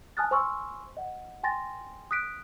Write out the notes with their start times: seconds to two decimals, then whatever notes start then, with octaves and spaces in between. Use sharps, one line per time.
0.17 G#5 A5 D#6 F6 F#6 A6
0.31 C5 G#5 C6 C#6 E6 F6
0.97 D#5 F#5
1.43 G5 G#5 C6 A6 A#6
2.11 D#6 F#6 B6 D7